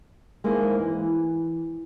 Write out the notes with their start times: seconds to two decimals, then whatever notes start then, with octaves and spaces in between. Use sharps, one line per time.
0.44 G#3 A#3 D#4 E4 C5
0.79 E3